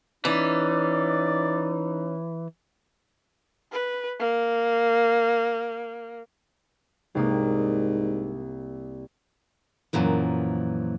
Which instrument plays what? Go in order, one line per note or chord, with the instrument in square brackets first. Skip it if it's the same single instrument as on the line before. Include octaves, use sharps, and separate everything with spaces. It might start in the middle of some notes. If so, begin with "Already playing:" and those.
[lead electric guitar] E3 [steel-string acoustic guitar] C#4 [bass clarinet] D#4 [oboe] D5
[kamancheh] B4
A#3
[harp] C2 A#3 D#6 [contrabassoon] G#2
[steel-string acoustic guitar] F#2 A#2 E3 F3